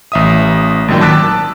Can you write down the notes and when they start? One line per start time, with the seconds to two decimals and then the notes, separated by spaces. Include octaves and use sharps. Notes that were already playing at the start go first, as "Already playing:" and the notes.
0.12 A1 E5 D#6
0.88 G#1 A#2 D#3 F#3 G5
1.01 A5 D6 E6 F#6 A6 B6